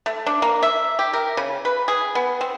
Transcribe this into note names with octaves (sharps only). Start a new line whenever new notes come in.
A3
D4
A#3
E5
G4
A#4
C#3
B4
G#4
B3
C4